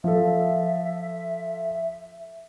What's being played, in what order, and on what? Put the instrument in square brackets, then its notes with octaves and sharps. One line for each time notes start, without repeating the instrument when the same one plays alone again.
[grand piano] F3 A4 [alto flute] E5